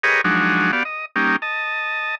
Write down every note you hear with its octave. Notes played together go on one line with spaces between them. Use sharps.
G4 G#4 A#4 B4 C#5 D#5
F3 F#3 G#3 D4 D#4 F#4
B3 F#4 G4 D5 F5
D#5
G3 A#3 C#4 D#4 G4
D#5 A5